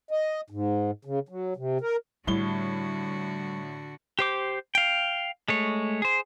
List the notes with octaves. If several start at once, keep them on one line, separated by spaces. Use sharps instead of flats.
D#5
G#2
C#3
F#3
C3
A#4
A2 D3 G3 F#4 G7
G4 C5 D6
F5 G5
G#3 A3 C#5
G#4 C5